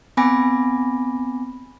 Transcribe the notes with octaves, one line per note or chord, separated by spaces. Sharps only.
B3 C4 G#5 B5 D6 A#6